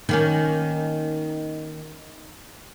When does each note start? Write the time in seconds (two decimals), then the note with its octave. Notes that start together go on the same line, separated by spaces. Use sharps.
0.09 D#3 A#3 C#4